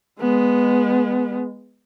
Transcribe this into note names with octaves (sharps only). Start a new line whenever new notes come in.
G#3 B3